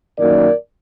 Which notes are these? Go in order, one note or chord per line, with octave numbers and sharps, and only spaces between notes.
F#2 D#3 F#3 A#3 A#4 D5